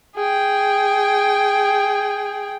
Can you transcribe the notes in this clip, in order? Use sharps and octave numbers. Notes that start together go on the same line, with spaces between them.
G#4 G5